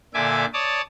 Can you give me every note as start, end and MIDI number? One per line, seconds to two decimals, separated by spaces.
0.14 0.45 46
0.14 0.45 50
0.14 0.45 76
0.14 0.45 80
0.14 0.45 86
0.53 0.82 73
0.53 0.82 74
0.53 0.82 81
0.53 0.82 87